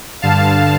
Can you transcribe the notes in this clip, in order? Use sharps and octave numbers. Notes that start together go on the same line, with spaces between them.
G2 D3 F5 A5